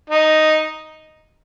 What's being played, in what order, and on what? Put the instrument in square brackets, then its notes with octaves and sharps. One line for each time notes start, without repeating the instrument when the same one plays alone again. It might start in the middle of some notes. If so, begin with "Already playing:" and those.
[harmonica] D#4